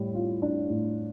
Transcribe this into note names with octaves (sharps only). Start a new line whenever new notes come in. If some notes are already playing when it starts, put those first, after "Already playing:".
Already playing: A2 G3
F4
D4
A2